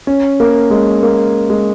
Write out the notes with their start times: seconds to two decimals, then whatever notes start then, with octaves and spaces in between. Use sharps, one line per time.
0.07 C#4
0.40 A#3
0.70 G#3
1.03 A#3
1.50 G#3